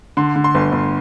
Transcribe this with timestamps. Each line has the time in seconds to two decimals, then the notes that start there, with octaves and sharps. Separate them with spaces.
0.17 D3 C6
0.36 D3
0.44 C6
0.55 G1
0.72 G1